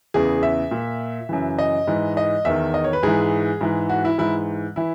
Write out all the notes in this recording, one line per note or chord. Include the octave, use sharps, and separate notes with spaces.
E2 C#3 E3 G#4
E5
A#2
F#2 C#3 E3
D#5
G#2 E3
D#5
E2 D#3 E5
D#5
C#5
B4
G#2 E3 G#4
G#2 E3
F#4
E4
G#2 E3 E4
E3 E4